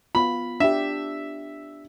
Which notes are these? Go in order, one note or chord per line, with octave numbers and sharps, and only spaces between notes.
B3 F4 B5
D4 G4 E5